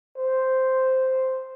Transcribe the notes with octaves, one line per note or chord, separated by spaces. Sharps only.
C5